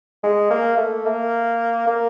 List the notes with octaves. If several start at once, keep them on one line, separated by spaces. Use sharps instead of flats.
G#3
A#3
A3
A#3
A#3